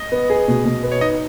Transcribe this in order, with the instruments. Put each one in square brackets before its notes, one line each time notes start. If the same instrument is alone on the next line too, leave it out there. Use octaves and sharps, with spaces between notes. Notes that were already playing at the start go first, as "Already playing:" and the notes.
Already playing: [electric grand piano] D#5
[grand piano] B3
G#4
B2
B2
B3
[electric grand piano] C#5
[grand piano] D#4 [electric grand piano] D#5